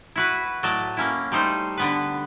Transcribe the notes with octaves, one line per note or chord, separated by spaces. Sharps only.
E4 F#4 B4
A2 F#3 D5 D#5 A5
A#3 C#4 E4
G3 A3 D#4 C5
D3 B3 B4